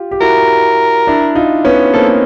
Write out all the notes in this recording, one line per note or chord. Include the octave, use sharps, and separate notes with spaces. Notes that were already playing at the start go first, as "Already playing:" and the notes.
Already playing: F4 G4
G4
E4 F#4 A#4
D4 E4
D#4 F4
B3 C#4
A#3 C4 A4